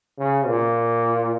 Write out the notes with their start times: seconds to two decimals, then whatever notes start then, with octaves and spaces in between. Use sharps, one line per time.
0.19 C#3
0.47 A#2